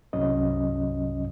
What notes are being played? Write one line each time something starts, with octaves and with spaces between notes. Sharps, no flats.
C2 G2 C3 F#3 C#4 D#5